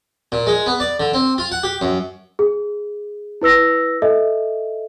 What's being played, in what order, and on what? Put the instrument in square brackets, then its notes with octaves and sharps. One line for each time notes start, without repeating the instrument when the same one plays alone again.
[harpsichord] A#2
G#3
B3
D5
D3
C4
F4
F#5
G4
F#2
[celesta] G#4
E4 B4 E6 A#6
A4 D#5 E5